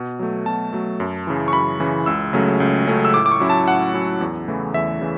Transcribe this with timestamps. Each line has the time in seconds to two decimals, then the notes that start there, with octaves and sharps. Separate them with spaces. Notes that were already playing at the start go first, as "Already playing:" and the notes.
Already playing: B2
0.19 F#3 A3
0.46 B2 A5
0.73 F#3 A3
1.00 F#2
1.27 C#3 E3
1.48 C#6
1.53 F#2 B5
1.80 C#3 E3
2.06 C#2 E6
2.33 C#3 F#3 A3 C#4
2.60 C#2
2.87 C#3 F#3 A3 C#4
3.05 E6
3.14 A2 D6
3.26 D6
3.32 C#6
3.40 F#3 C#4 E4
3.50 A5
3.68 A2 F#5
3.94 F#3 C#4 E4
4.21 E2
4.48 C#3 E3 A3 E4
4.74 E2 E5
5.01 C#3 E3